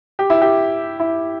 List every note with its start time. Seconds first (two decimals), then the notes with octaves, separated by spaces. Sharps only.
0.19 G4
0.30 E4
0.41 G4
1.00 E4